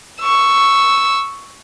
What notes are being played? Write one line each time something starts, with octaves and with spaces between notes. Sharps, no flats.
C#6 E6